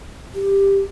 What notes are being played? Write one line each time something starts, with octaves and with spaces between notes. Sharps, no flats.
G4